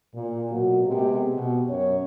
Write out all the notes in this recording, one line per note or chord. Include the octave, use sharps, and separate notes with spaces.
A#2
B2 F#3 A#3 F#4
C3 G#3 A#3 B3 G4
B2
F#2 C#5